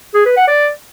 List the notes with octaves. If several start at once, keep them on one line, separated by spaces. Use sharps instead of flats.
G#4
B4
F#5
D5